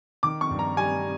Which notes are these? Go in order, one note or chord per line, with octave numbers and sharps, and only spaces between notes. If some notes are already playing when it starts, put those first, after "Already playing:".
D#3 D6
C#6
G2
A#5
G3 G#5